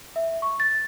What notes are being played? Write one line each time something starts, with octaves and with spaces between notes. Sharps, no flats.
E5
C#6
A6